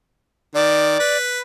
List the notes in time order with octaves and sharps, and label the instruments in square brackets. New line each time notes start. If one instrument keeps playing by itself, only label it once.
[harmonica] D#3 [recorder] D5
[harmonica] B4